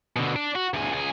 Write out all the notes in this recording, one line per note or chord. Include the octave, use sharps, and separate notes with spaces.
B2 D3
D4
F#4
D2 G#4
C#2 G#4